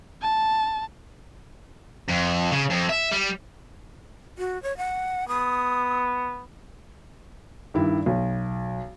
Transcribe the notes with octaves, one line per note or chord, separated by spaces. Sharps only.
A5
F2
C#3
F2
E5
G3
F#4
C#5
F#5
B3 D#6
G2 D#3 G3 E4
B1